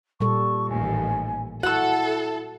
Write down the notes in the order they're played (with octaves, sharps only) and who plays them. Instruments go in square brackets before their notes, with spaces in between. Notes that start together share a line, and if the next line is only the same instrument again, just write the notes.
[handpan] A#2 G3 A4 [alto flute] C#6
[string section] A1 D#2 [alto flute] G#5
[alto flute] E4 [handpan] F#4 [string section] A4 [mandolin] F#5 E6